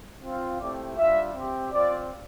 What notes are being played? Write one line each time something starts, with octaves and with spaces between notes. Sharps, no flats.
C4 F4
A3 C4 E4 G4 D5
G3 D4 F4 E5
C4 G4
C4 F4 D5